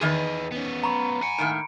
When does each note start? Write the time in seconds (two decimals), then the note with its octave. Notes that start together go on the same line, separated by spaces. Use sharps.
0.01 E2 D#3 G#4 B4 D#5
0.51 B3 C#4
0.84 A#5 B5 C#6
1.23 F#5 G#5 C#7
1.39 A2 D#3 A#3 D7